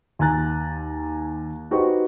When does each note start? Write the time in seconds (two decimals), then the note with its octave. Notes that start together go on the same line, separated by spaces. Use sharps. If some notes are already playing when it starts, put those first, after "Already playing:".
0.19 D#2 G#5 A#5 F#6 A6
1.71 D#4 F#4 G4 B4 C5 C#6